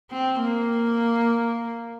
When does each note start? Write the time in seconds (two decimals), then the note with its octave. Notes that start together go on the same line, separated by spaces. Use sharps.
0.11 C4
0.41 A#3